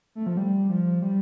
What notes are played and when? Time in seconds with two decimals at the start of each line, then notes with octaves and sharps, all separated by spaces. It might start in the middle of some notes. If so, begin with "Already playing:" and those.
0.15 A3
0.26 F3
0.37 G3
0.69 F3
1.02 G3